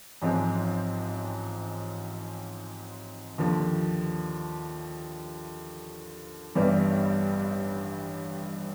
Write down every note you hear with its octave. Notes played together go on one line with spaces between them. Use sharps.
A1 G#2 F3 G#3 C4
D#2 D3 F3
A1 G2 E3 G3 B3